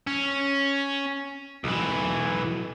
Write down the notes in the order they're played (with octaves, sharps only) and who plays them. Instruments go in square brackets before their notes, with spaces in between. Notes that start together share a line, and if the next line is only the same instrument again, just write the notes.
[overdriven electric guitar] C#4
B1 E3